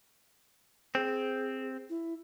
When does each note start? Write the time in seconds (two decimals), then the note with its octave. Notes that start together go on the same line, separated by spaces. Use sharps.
0.95 C4 G#4
1.90 E4